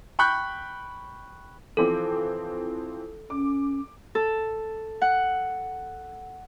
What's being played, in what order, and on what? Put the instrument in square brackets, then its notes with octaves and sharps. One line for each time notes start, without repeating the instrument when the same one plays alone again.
[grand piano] G5 B5 C#6 F#6 G6
[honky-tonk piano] E3 F3 C4 [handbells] A4
[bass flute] C#4 [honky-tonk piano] D6
[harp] A4
F#5